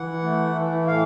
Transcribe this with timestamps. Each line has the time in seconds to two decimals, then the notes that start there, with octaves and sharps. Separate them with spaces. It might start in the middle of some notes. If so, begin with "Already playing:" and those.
Already playing: E3 F#5
0.23 A3
0.55 E3
0.86 A2 F5